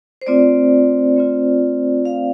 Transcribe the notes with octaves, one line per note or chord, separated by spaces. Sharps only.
C5
A3 C4 F4 D5
A3 C4 F4
A3 C4 F4 F5